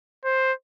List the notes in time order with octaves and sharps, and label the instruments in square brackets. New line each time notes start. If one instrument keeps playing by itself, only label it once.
[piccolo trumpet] C5